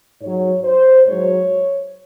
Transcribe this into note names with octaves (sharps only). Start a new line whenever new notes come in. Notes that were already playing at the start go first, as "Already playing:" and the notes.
G#2 F#3 C#5
C5
G#2 F#3 C#5